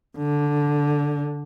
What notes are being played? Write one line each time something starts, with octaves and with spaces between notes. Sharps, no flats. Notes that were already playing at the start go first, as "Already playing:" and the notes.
D3